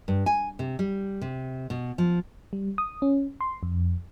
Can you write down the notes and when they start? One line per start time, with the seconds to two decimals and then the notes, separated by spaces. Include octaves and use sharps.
0.08 G2
0.26 G#5
0.59 C3
0.79 G3
1.21 C3
1.70 B2
1.98 F3
2.53 G3
2.78 D#6
3.02 C#4
3.41 C6
3.63 F2